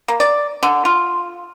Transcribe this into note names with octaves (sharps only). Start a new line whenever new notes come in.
A#3
D5
D3
F4